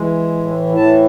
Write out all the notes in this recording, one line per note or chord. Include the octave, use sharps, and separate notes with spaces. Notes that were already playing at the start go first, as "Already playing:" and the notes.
Already playing: E3 G#3
A2
E3 A5